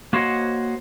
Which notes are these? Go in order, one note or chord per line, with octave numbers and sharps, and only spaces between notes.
A#3 F#4 C5 C#5 D#5 F#5